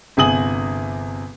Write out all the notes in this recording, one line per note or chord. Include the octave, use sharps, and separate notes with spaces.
G1 C3 G#4 G#5 D#6 F#7